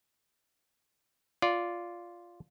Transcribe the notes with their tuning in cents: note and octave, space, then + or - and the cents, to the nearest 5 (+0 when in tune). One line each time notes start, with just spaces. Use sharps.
F4 +0 D5 -10